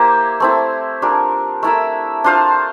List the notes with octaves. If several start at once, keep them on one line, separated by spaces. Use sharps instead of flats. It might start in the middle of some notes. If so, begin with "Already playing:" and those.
Already playing: A#3 E4 G4 C5
A3 C4 E4
G3 D4 F4 A#4
A3 E4 A#4 E5
D4 F4 C5 F5